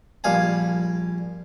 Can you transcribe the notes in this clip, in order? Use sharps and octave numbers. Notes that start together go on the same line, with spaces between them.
A#1 G3 F5 G#5 A5